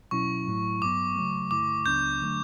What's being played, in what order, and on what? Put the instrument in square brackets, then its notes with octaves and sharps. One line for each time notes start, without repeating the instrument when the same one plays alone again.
[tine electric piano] B2 F#3 C#4 E4 [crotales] C#6
[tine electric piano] A2 F#3 A3 E4
[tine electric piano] G2 F#3 B3 [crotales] D6
[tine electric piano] C#3 F#3 A3
[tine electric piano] G2 D3 A3 E4 [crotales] D6
[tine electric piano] C#2 C#3 F#3 B3 D4 [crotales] G6
[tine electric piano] D3 F#3 A3 D4